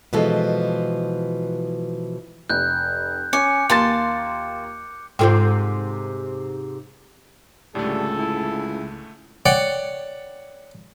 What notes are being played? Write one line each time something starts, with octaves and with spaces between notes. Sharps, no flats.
B2 E3 F3 G#3 A4
F1 F#6 G6
C#4 G#5 D6 C#7
D#2 A#3 F4 A5 C6 A6
G#2 C3 F4 A4 C5 G5
C#2 A2 D3 G3 A3 A4
E4
C#5 D5 F#5 G5